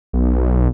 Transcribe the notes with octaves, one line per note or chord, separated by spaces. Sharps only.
B1